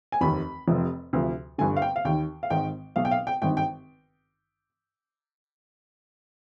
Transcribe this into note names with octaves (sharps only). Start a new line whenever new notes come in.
G#5
F1 D#2 D#3 B5
F1 F2 C3 F3
D2 C3 F3
G1 G2 D3 G#5
F5
G5
F5
D#2 D#3 G5
F5
G#1 G#2 D#3 G5
B1 B2 F5
G5
F5
G5
G#1 G2 D#3 G5
G5